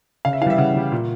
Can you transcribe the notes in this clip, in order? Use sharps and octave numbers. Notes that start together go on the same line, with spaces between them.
C#3 F5
E5
E3 F5
G3 E5
C#3 F#5
E3 G3
A#2